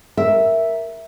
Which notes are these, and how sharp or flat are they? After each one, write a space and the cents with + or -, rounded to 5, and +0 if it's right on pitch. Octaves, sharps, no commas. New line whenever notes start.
A#4 +0 E5 +0